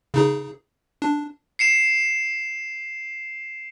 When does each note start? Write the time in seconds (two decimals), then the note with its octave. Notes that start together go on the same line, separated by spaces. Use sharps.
0.14 C#3 D#4 G#4
1.02 D4
1.59 C7 C#7 E7